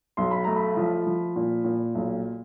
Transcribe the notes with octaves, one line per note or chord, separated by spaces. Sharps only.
B1 C6
B5
A3 A#5
B5
F3
F3
A#2
A#2
B1